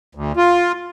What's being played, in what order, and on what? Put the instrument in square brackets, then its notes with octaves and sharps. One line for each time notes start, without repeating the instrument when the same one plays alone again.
[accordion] D2
F4